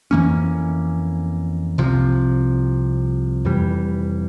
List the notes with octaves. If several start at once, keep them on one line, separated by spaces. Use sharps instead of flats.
F2 E3 A#3 C#4
C2 C3 F3
F1 F2 E3 G3